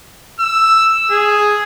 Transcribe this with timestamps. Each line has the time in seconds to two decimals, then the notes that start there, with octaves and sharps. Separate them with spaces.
0.40 E6
1.12 G#4